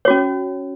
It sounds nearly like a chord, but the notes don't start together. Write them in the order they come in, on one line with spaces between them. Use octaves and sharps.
C#5 F#4 C#4